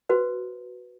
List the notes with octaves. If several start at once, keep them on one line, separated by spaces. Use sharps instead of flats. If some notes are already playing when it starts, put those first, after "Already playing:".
F#4 B4 C5